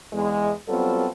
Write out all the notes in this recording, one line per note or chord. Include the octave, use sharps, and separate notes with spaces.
E2 G#3
F#3 G3 B3 C4 F4 A4